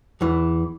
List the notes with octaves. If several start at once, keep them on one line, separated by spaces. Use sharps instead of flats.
E2 E3